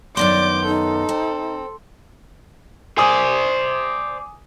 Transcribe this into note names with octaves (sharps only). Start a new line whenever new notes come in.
F#2 D#3 B3 D5 C6 D6 G6
D#4 A4
C4
C5 D5 G#5 D#6